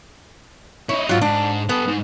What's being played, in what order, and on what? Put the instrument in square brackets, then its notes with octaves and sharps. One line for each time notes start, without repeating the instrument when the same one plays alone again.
[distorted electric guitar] D#4 E4 [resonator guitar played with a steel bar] C#5
[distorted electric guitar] G#2 [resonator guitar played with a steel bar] F#3 F4
[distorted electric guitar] G#2 [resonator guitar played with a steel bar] D4
[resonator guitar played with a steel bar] B3 [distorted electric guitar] G4 A4
[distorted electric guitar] G#2 D#4